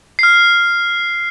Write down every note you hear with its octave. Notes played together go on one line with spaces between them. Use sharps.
F6 C7